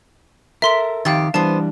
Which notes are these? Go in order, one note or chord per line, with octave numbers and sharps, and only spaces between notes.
A4 A#4 E5 C6 B6
F2 D#3 G4 F5 A6
E3 G3 B3 D4 C5 A5